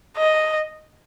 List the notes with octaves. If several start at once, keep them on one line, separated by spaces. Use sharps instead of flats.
D#5